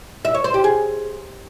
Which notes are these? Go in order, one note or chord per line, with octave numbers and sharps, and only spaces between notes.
E5
C#5
C5
G4
G#4